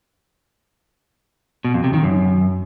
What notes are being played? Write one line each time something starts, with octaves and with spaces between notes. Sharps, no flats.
B2
F2
C3
D#3
F#2